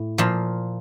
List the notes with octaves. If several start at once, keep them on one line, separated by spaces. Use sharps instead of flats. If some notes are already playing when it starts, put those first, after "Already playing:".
Already playing: A2
A#2 F3